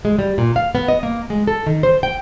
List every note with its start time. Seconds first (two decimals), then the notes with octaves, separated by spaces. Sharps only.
0.05 G#3
0.19 G3
0.38 A#2
0.56 F5
0.75 B3
0.88 D#5
1.03 A#3
1.30 G#3
1.47 A4
1.66 D#3
1.83 C5
2.03 G5